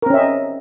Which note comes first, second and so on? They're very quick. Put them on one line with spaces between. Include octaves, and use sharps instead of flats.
A#4 C4 C#4 E5 D#5